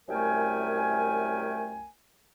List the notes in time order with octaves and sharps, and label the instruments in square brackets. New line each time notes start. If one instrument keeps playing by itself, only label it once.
[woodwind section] C2 F#2 A3 A#4 G5 G#5